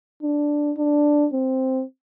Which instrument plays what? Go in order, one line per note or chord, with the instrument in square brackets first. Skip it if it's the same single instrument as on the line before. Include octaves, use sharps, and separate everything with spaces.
[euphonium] D4
D4
C4